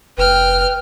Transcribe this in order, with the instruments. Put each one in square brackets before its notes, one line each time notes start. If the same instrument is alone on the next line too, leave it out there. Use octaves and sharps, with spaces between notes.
[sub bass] F1 [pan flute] B4 [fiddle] G5 F6